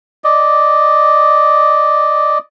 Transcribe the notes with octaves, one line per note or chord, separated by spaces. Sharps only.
D5 D#5